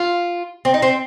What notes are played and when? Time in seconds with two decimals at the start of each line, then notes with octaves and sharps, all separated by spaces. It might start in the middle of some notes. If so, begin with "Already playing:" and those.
Already playing: F4
0.65 C4
0.74 D#4
0.82 C4